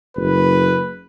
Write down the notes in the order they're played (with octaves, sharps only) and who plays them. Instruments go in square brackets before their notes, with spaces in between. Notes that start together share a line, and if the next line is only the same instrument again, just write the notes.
[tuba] F#1 [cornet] B4